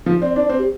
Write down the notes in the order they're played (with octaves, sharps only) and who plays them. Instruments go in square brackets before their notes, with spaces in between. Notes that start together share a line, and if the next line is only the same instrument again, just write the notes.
[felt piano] F3
[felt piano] C4 [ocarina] D5
[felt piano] D4 [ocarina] D5
[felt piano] C4 [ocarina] C5
[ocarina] G4